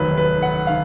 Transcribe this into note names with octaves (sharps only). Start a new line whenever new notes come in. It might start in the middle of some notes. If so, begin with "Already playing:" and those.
Already playing: F1 D#2 D#3 F#3 B4
B4
F#5
D#3 F5